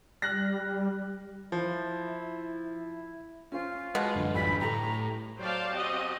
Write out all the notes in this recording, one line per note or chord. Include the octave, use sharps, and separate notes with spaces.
G3 F6 F#6 A#6
F3 E4
C#4 F4 C5
B2 G#3
A1 F#2 D3
D2 G3 B5 B6
A2 G4 A4 A#5
F#3 C5 D5 F5 G5 A5
C4 F#4 G4 D#5